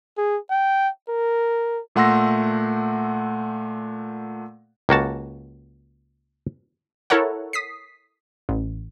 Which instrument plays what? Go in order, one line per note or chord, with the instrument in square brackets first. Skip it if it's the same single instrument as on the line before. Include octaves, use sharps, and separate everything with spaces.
[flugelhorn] G#4
G5
A#4
[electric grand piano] A#2 A3 F#5 C6 E6 A#6
[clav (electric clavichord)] C#2 A#3 F#4 A5
[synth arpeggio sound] E4 A4 A#4 C#5 F#5
D#6 B6 C7
[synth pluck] A1